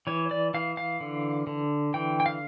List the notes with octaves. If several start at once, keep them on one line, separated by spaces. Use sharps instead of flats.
E3 C#5
D5
E3 F5
F5
D3
D3
E3 G5
G5
F5